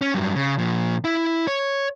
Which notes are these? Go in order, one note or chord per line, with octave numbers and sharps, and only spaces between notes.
C#4
G2 F#3
C#3
A#2 F3
E4
C#5